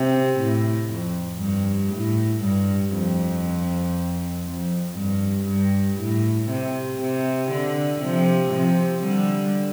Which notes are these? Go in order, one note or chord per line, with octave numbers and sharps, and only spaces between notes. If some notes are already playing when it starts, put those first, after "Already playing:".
Already playing: C3
A2
F2
G2
A2
G2
F2
F2
G2
G2
A2
C3
C3
D3
C3 F3
C3 F3
D3 G3